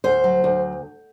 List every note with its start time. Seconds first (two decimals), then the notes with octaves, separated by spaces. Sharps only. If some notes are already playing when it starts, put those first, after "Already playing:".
0.04 D2 C5
0.24 F#3
0.44 D2